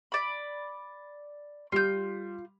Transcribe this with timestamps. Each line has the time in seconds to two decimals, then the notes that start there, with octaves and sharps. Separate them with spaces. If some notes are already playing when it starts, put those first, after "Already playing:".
0.12 D5 B5
1.72 G3 F4 G6